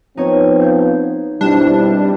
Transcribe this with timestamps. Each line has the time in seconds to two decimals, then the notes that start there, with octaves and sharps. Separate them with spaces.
0.17 F3 B3 C4 D#4 C#5
0.60 F5 G6 G#6
1.41 B2 G3 C4 D4 E4